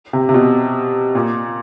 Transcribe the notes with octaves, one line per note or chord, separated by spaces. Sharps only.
C3
C3
B2
A#2